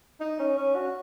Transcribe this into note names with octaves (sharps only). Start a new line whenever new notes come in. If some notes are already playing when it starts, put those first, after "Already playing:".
D#4
C#4
C#4
F#4